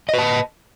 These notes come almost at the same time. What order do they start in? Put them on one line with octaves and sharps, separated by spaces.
D#5 B4 A5